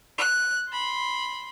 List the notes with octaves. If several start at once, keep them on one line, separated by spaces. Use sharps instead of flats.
F#6
B5 C6